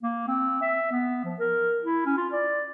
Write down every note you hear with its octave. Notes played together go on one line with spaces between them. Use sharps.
A#3
C4
E5
B3
F3
A#4
E4
C#4
F4
D5